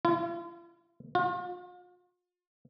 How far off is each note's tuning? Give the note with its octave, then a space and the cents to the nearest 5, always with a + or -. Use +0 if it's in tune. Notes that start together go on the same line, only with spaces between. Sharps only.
F4 -45
F4 +40